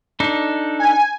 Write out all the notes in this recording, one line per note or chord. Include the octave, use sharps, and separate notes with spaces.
D4 D#4 A4
G#5